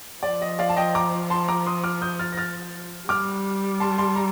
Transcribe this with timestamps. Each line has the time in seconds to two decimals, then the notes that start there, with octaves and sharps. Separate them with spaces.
0.23 F3 D5
0.42 D#5
0.59 D5 F5
0.69 A5
0.77 D#5 G5
0.95 A#5 D6
1.30 A5 C6
1.48 A#5 D6
1.66 C6 D#6
1.84 D6 F6
2.02 D#6 G6
2.19 F6 A6
2.32 A#6
2.37 F6 A6
3.09 G3 D6 F6
3.80 A5 C6
3.98 A5 C6
4.16 A#5